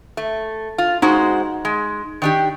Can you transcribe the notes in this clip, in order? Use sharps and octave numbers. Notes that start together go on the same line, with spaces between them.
A3
F4
G#3 D#4 F#4 C5
G#3
D#3 D4 G4